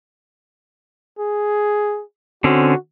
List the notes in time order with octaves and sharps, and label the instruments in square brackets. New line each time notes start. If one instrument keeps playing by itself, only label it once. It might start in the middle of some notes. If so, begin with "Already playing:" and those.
[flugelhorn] G#4
[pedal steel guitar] D3 C4 C#4 [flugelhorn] F#4